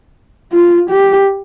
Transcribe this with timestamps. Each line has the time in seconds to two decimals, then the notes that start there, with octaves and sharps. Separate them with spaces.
0.52 F4
0.90 G4